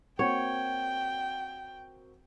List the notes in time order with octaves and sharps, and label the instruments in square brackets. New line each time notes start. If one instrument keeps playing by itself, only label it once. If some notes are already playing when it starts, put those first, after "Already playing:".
[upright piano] A#3 C4 F#4 [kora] C#5 [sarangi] G5